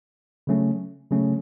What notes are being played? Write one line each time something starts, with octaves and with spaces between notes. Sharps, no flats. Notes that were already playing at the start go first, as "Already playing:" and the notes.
C#3 F#3 A3 C#4
C#3 F#3 A3 C#4